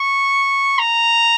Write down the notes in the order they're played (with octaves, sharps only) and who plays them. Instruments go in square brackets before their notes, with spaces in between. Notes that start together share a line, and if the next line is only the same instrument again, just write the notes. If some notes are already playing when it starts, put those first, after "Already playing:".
Already playing: [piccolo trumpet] C#6
A#5